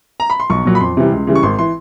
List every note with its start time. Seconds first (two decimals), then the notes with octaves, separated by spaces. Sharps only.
0.20 A#5
0.30 B5
0.40 C6
0.50 B1 C#6
0.65 A#2 F#3
0.75 B5
0.81 F2 C6
0.97 C3 E3 G3
1.12 C#2
1.27 C#3 E3 G3
1.35 C#6
1.43 G#1 C6
1.58 E3 C6